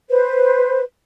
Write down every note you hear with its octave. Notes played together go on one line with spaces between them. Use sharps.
B4 C5